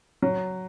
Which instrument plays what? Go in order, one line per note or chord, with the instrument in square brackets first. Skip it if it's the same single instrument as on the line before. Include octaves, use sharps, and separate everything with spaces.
[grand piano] F#3